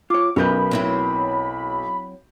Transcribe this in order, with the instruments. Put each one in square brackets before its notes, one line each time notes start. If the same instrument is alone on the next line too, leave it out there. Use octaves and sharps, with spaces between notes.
[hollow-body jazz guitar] F4 C#5 [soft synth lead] D6
[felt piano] B1 G6 [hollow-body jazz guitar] C#4 A#4 B4 [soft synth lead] B5
[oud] F#3 C4 E4